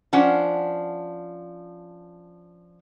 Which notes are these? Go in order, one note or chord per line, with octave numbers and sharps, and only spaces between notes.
F3 C#4 D4 F#5